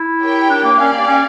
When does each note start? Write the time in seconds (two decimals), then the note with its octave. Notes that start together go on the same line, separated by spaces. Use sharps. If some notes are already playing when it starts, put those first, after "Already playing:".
Already playing: E4
0.21 G4 A#4 C#5 G5
0.50 D4
0.64 A#3
0.79 C#4 G4 D5 F5
0.93 A#3
1.07 C#4